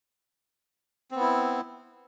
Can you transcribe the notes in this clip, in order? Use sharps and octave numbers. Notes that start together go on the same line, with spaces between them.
B3 C4 E4